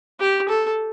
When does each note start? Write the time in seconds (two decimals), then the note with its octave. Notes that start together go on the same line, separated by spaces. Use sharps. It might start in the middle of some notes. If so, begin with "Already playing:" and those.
0.20 G4
0.49 A4